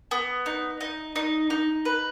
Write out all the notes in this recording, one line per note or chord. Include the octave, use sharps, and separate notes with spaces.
B3
D#4
D#4
D#4
D#4
B4